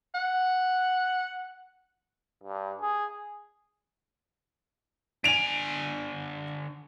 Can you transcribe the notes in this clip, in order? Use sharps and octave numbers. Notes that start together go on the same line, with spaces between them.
F#5
G2
G#4
D3 G#5 D7 F7